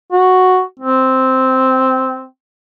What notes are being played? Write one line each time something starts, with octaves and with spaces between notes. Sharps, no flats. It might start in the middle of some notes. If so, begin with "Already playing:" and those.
F#4
C4